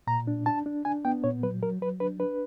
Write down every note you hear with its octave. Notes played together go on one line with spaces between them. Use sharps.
A#2 A#5
D4
D4 A5
D4
D4 G#5
B3 G5
A#2 C#5
F#3 B4
F#3 A#4
F#3 B4
D4 B4
D4 B4